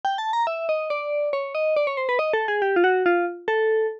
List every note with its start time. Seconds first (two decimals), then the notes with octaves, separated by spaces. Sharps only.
0.05 G5
0.18 A5
0.33 A#5
0.47 E5
0.69 D#5
0.90 D5
1.33 C#5
1.55 D#5
1.76 D5
1.87 C#5
1.97 C5
2.09 B4
2.19 D#5
2.33 A4
2.48 G#4
2.62 G4
2.76 F4
2.84 F#4
3.06 F4
3.48 A4